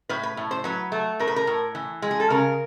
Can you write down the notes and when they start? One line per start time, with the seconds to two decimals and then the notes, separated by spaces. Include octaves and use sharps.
0.09 A2 B4
0.23 B4
0.37 A2
0.51 C5
0.64 F#3 B4
0.92 A3
1.19 A2 A#4
1.27 B4
1.36 A#4
1.47 A2
1.75 E3
2.02 G#3
2.11 G#4
2.20 A4
2.30 C#3 A#4